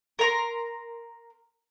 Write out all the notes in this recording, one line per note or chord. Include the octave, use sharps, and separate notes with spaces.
A#4 A#5 C6